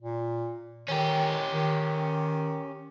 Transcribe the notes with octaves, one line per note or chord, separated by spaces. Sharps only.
A#2
D#3 C#4 G4
D#3